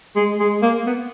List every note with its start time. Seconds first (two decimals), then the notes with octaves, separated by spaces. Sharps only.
0.16 G#3
0.40 G#3
0.63 A#3
0.87 B3